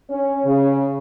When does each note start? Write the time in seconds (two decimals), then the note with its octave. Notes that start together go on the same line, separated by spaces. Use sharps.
0.10 C#4
0.45 C#3